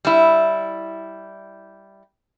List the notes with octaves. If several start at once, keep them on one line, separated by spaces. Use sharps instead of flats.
G3 E4